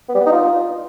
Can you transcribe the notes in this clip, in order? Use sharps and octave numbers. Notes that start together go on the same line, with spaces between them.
B3
G3
B3
D#4
F4